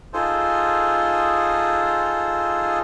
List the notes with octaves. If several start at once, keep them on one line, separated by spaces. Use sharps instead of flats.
D#4 F4 G#4 A4 C5